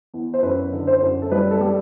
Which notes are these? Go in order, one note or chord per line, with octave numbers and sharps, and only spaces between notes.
E2
C5
F#2 B4
D3
C5
F#2
A4
G3 B4
A4
G3 G4